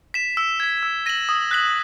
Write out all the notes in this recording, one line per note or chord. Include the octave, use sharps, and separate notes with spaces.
B6 E7
E6
G#6 B6
E6
A#6 D#7 F#7
D#6
F#6 B6 F#7